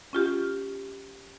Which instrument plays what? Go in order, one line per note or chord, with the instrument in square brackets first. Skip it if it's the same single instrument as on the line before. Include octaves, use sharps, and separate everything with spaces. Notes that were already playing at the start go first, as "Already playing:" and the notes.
[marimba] C#4 F4 G4